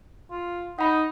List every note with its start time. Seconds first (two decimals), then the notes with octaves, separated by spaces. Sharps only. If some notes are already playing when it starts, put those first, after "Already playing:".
0.31 F4
0.79 D#4 F#5 B5